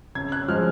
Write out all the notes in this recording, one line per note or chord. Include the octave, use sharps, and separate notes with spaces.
C#3 G#6
F#6
F3 G#3 F6